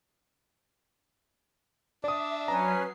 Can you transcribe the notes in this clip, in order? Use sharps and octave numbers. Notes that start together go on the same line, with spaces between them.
D4 D5 E5 D#6
F#3 C#4 B4 A#5 C7